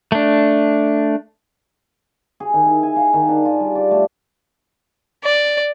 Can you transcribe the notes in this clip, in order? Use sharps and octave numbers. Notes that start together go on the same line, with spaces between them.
A3 D4
G#4
D#3
E4
G#5
F5
D#3
D4
F4
G3
D5
A3
D5